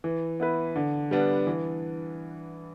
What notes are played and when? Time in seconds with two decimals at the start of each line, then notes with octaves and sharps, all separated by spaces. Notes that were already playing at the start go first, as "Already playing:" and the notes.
0.04 E3
0.40 B3 E4 B4
0.76 D3
1.11 G3 B3 D4
1.47 E3